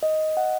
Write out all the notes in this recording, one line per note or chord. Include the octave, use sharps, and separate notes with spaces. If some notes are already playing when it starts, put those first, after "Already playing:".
D#5
F#5